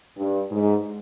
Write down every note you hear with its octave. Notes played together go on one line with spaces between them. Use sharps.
G2
G#2